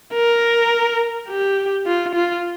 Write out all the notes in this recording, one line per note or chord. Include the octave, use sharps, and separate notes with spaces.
A#4
G4
F4
F4